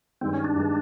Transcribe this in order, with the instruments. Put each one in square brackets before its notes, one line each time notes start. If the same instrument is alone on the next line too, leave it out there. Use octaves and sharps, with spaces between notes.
[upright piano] G2 D#3 G#3 [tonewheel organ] C4
[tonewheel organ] C#4
D4
[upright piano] G2 D#3 G#3